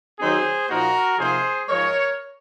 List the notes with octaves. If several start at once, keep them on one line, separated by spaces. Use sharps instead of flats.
D#3 F#3 C4 D#4 G#4 C5
A#2 F3 A#3 D#4 F#4 A#4
C3 F3 A#3 D#4 G#4 C5
G#2 F3 G#3 A#4 C#5